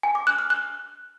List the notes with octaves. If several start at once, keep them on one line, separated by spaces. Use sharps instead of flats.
G#5
D6
F#6
F6
F#6